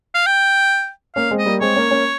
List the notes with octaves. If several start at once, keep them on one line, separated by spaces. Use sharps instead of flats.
F5
G5
A#3 C#4 F5
G#3 C4
D#5
G3 A#3
G#3 C4 C#5
A#3 C#4
A#3 C#4